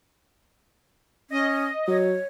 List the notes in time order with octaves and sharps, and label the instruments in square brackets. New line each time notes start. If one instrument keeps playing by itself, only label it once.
[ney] C#4 [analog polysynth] D#5
[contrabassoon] F#3 [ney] C#5